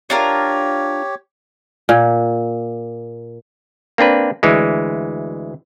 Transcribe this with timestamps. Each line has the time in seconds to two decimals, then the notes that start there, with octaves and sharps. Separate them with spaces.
0.10 D4 F4 G4 A#4 C#5
1.89 A#2
3.98 A#3 C4 D4 B4
4.43 D2 E3 G#3